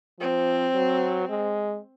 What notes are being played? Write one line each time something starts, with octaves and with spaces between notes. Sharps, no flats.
F3 C4
F#3
G#3